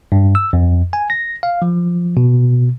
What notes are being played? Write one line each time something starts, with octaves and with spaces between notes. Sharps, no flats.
G2
E6
F2
G#5
A#6
F5
F3
B2